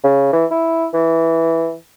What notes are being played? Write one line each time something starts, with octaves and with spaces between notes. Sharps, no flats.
C#3
E3
E4
E3